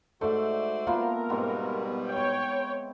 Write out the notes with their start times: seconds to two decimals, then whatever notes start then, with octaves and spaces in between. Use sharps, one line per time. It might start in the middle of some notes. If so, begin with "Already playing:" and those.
0.21 G#2 A3 F#4 C5 D5 E5
0.87 A#3 B3 F4 A4 A#4
1.30 G#2 B2 G3 B3 C4
2.07 C#5 G5